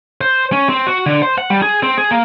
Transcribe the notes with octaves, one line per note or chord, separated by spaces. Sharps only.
C5
C#4
C4
F#4
D3
C5
F#5
G3
G#4
C4
G#4
A#3